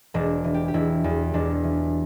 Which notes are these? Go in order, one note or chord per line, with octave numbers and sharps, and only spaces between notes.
E1 D4
E3
G4
G4
E1 E4
E2
E1 D4
E3